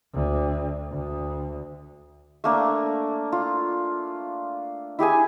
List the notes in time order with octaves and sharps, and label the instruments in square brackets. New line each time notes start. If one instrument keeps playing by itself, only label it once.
[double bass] D2
D2
[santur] A3 A#3 D4
F4
E4 G4 G#4 G#5